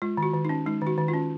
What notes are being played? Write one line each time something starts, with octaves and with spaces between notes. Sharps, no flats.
G#3 F4
D#3
F#4
D#3
C#4 D#4
G#3 D#4
D#3
F#4
D#3
F4
C#4